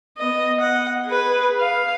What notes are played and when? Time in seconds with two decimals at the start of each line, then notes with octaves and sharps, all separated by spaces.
0.18 B3 D#5
0.61 F#5
1.06 G#4 B4
1.60 F5